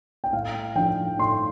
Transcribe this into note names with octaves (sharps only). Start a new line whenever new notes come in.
G5
A2 F5
F3 D4 G5
A2 C6